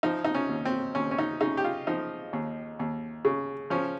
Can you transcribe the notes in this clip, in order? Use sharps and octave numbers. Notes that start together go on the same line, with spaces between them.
F3 D#4
D#4
C#4
D#2
C4
D#2 C#4
C#4
D#4
C#3 D#4
G4
F4
F3 D#4
D#2
D#2
C#3
F3 C#4